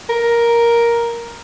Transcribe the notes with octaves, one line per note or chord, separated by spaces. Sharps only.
A#4